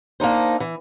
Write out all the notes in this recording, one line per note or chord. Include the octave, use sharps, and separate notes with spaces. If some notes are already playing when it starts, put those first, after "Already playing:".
A#3 D4 D#4 C5
E3